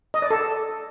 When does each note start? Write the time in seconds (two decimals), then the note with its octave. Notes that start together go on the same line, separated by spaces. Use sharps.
0.14 D#5
0.22 D5
0.30 A4